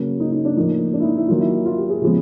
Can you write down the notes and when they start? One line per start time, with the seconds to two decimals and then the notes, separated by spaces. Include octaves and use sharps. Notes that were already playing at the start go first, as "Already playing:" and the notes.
Already playing: C#3 F#3 A#3
0.20 D#4
0.32 D#4
0.45 D4
0.57 A2 F3 A#3 D#4
0.93 D4
1.00 E4
1.04 D#4
1.17 E4
1.28 D#3 F#3 A#3 F4
1.40 E4
1.66 F4
1.78 G4
1.90 G#4
2.02 C#3 F3 G#3 B3